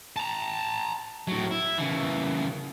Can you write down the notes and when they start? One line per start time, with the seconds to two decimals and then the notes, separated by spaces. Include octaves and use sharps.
0.16 A5 A#5
1.28 A2 F#3
1.51 E4
1.78 C#3 E3